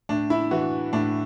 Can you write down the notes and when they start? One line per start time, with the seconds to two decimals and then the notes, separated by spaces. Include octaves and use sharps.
0.09 A2 D4
0.30 E4
0.51 E3 F#4
0.93 A2 D4